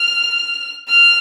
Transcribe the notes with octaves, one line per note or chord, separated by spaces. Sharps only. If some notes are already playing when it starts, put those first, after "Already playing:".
Already playing: F6
F6